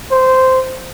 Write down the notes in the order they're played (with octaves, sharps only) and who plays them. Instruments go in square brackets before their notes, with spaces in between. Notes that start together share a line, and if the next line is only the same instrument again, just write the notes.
[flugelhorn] C5